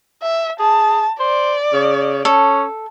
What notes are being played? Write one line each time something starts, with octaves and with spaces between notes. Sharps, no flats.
E5
G#4 A5
C5 D5
C#3
C#4 A4